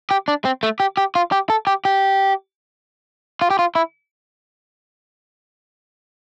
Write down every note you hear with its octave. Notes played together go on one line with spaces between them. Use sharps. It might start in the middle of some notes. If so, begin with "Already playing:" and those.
G4
D4
C4
A3
G4
G4
F4
G4
A4
G4
G4
F4
G4
F4
E4